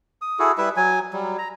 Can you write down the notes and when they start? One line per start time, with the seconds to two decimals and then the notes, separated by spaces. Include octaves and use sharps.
0.22 D#6
0.39 E4 F#4 G#4 A4
0.58 G3 E4 B4 E5
0.77 F#3 G#5
1.13 F#3 G3
1.39 A#5